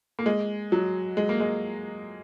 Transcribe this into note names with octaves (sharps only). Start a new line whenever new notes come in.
A#3
G#3
F#3
G#3
A#3
G#3